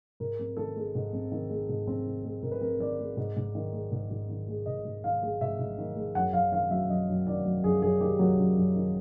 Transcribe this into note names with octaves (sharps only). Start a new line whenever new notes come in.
G#2 A#4
C4
D#3 A4
G#3
G#2
C4
D#3
G#3
G#2
C4
D#3
G#3
G#2 A#4
B4
C4 A#4
D#3 D5
G#3
G#2
G#2
D#3
G#3
G#2
G#2
D#3
G#3
G#2 D#5
G#2
D#3 F5
G#3
G#2 E5
G#2
D#3
G#3
F#2 F#5
F#2 F5
D#3 F5
F#3 E5
F#2 D#5
F#2
D#3 D5
F#3
F#2 G#4
F#2 G#4
D#3 G4
F#3 G#4
F#2
F#2
D#3